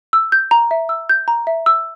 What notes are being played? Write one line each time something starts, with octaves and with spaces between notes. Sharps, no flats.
E6
G6
A#5
E5
E6
G6
A#5
E5
E6